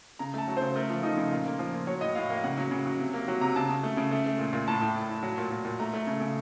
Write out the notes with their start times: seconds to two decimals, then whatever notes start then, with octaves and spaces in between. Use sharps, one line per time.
0.19 C#3 A#5
0.34 A3 A5
0.48 F#3
0.57 C#3 C5
0.76 A3 A#4
0.89 F3 F4
1.03 F3 D#4
1.17 C#3
1.32 A#2 F4
1.46 A#3
1.59 F3
1.73 A#2
1.87 F#3 C#5
2.01 A2 D#5
2.15 A2 F5
2.30 A#3 F5
2.44 C#3 F#5
2.57 F#3
2.71 C#3
2.85 F#3
3.00 C3
3.14 A#3
3.28 F#3
3.41 C3 A#5
3.56 C#3 A5
3.69 C#3
3.83 A3
3.97 C#3
4.11 A3
4.26 A3
4.39 A#2
4.53 A#2
4.68 A2 A5
4.81 A2
4.96 A2
5.10 A2
5.23 F#3
5.38 A#2
5.51 A#2
5.65 A#2
5.80 A3 A#5
5.94 A3
6.07 C#3
6.21 C#3